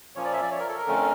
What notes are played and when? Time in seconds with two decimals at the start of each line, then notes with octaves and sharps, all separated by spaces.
0.15 A#2 F3 A#3 C#4 C#5
0.25 D5
0.33 E5
0.42 D5
0.51 C#5
0.60 A#4
0.68 A4
0.78 A#4
0.87 F2 D3 A3 C#4